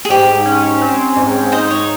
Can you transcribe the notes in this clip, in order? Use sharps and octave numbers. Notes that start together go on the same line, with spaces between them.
G#4
G#2 G4
C#4
C4
G#2
D#4 C5 D#5
C#5